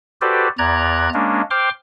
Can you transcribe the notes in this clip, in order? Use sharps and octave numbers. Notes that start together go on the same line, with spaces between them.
F#4 G4 A4 B4 C5 D5
E2 D5 A#5 F#6 G#6
G#3 A#3 C#4 D4
C5 G5 C6 D6 F6